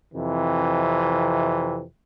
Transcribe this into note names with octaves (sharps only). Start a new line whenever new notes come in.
F2 C3 E3